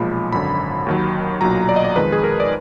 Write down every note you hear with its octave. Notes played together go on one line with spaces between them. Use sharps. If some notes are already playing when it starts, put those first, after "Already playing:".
Already playing: B1 A#2 F3 G#3 B5
G#1 F#2 D3 B5
D#2 D#3 F#3
B1 A#2 F#3 A#5
D5
D#5
D5
F2 D#3 G#3 B4
G#4
A#4
D5